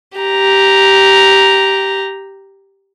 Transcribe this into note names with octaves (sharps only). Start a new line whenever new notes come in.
G4 A#5